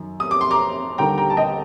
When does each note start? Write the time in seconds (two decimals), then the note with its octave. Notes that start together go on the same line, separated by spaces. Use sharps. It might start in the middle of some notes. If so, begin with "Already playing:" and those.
Already playing: F#2 D#3
0.20 D#6
0.31 D6
0.41 C6
0.51 A#5 D6
0.98 D#2 D3 G3 G5 A#5
1.18 G5 A#5
1.30 A5
1.37 D#5 G5